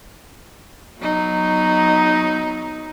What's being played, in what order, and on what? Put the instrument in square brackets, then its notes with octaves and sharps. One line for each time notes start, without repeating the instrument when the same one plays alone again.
[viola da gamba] F#3 B3 D#4